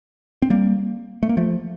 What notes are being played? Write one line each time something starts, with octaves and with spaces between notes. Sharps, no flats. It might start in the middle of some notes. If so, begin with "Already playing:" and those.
C4
G3 A#3
A3
A#3
F3 A3